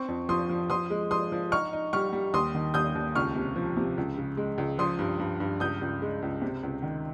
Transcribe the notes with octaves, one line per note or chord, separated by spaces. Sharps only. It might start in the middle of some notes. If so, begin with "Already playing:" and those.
Already playing: C4 C#6
F2
F3 C6 D#6
F3
F3 C6 D#6
G#3
F3 C6 D#6
F3
D#4 C#6 F6
D#4
G3 C#6 F6
G3
D#2 C6 D#6
D#3
D#2 D#6 G6
D#2
C#2 C#6 F6
C3
F3
C3
C#2
C#3
G#3
C#2
F3 C6 D#6
G2
G2
G2
C#2 D#6 G6
C#2
G#3
C#2
C3
C#2
D#3